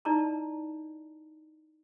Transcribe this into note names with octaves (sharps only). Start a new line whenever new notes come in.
D#4 E4 D5 D#5 A5 A#5